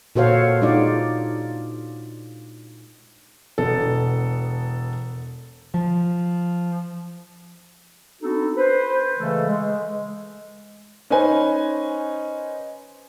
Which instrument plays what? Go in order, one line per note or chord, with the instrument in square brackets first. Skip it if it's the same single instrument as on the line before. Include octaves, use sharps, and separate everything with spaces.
[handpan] A#2 F#4 A4 C5 C#5 F5
G#3 D4 D#4 F4 D5
[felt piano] E1 B3 A4
[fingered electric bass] F3
[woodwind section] B3 C4 D4 D#4 F#4 A4
B4 C5
C#3 E3 G#3 A3 A4
G#3
[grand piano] C#4 D#4 B4 C5 G#5